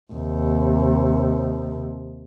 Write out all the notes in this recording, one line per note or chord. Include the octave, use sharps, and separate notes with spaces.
D#2 C3